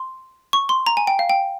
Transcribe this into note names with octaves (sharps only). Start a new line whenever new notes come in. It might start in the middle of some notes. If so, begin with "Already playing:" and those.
Already playing: C6
C#6
C6
A#5
G#5
G5
F5
G5